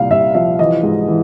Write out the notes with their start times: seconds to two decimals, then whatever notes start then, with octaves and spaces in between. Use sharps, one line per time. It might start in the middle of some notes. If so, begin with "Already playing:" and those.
Already playing: C2 A#2 F5
0.10 C2 E5
0.35 F3 E5
0.59 E3 D#5
0.83 G#2
1.08 E3